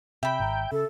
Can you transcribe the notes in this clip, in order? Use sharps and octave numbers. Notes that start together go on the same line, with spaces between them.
C3 E5 G5 B5
G#1 A#5
C#3 A4